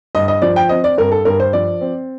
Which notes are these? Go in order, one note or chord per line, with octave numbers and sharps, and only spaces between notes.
G2 D#5
D#5
F3 D5
G5
C4 D#5
D5
G2 A#4
A4
G2 A#4
C5
F3 D5
C4